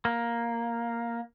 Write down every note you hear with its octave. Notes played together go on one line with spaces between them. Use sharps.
A#3